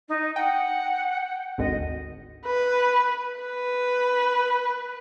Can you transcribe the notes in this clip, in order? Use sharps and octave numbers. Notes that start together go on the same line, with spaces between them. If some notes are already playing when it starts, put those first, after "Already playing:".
D#4
F#5 G5
G#1 D2 D#5
B4
B4